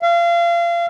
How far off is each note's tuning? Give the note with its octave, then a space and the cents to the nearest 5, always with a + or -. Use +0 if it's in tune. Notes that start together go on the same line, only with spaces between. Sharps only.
F5 -30